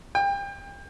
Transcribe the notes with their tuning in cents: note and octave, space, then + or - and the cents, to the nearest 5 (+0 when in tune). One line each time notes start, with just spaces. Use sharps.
G5 +30